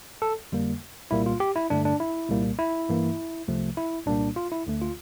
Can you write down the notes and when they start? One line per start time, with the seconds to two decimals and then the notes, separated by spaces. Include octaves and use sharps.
0.22 A4
0.52 F2 D3 G3 A#3
1.11 C2 A#2 G3 A#3 E4
1.26 F4
1.40 G4
1.56 E4
1.70 G2 D3 A3 D4
1.85 D4
2.00 E4
2.29 C2 A#2 G3 A#3
2.59 E4
2.89 G2 E3 A#3
3.47 C2 C3 F3 A3
3.77 E4
4.06 C2 A#2 G3 A#3 D4
4.36 F4
4.52 E4
4.67 D2 D3 A3
4.82 F4